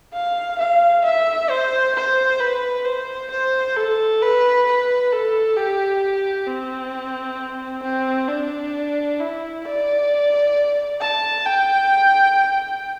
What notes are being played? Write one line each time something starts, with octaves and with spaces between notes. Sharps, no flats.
F5
F5
E5
C5
C5
B4
C5
C5
A4
B4
B4
A4
G4
C4
C4
D4
E4
D5
A5
G5